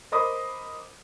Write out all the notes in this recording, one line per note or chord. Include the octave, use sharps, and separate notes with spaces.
A#4 C5 D#5 B5 D6 D#6